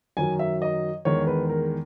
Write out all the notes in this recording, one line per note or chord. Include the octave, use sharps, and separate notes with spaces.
F#2 D#3 F#3 G#5
E5
D#5
E2 D#3 G#3 C#5
B4
A#4